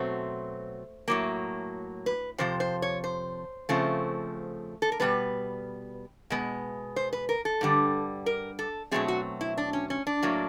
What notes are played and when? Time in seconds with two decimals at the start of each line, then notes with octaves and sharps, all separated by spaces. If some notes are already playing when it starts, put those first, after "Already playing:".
Already playing: B2 F#3 A3 C4 C5
1.08 A2 F#3 A#3
2.06 B4
2.38 F2 C3 F3 C5
2.60 C5
2.82 C#5
3.04 C5
3.69 C#3 F3 A3 C4
4.82 A4
4.92 A#4
5.00 B2 G3 B3 B4
6.30 B2 G#3 B3
6.96 C5
7.13 B4
7.29 A#4
7.45 A4
7.61 G2 D3 G3
8.26 A#4
8.59 A4
8.91 B2 F#3 A3 C4 G#4
9.08 F#4
9.41 E4
9.58 D4
9.73 C#4
9.90 C#4
10.07 D4
10.22 A2 F#3 A#3